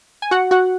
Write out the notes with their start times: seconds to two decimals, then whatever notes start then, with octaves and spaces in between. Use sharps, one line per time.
0.22 G#5
0.31 F#4 F#5
0.51 F#4 F#5